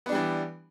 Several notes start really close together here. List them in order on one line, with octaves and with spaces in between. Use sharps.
B3 D4 G3 E3